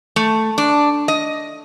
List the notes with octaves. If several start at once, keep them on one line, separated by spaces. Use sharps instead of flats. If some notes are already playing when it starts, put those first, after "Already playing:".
A3
D4
D#5